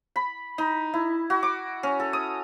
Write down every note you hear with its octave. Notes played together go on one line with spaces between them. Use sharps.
B5
D#4
E4
F#4
D6
C#4
A4
D#6